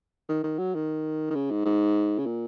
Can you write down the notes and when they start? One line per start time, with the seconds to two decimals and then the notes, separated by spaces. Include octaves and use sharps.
0.29 D#3
0.44 D#3
0.58 F#3
0.75 D#3
1.30 D#3
1.35 C#3
1.50 G#2
1.65 G#2
2.19 C#3
2.26 A#2